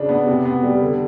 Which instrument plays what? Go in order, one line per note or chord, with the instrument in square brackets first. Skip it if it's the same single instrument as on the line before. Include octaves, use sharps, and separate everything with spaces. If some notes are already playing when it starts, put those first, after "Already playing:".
Already playing: [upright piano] C#3 D4
B3
C3
B3
G3
D3